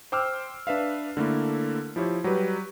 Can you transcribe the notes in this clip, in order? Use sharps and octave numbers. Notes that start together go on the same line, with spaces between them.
C5 G5 D6 E6 F6
D4 B4 E5 F5
D3 A3 A#3 E4
F3 E4 G4 C#5
F#3 G3 G4 B4